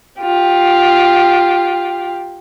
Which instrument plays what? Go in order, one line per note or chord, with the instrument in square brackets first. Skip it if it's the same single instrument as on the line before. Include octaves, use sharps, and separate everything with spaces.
[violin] F4 G4